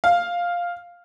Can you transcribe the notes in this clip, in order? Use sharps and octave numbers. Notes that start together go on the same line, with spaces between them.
F5